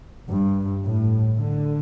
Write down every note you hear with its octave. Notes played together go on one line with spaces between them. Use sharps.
G2
A2
D3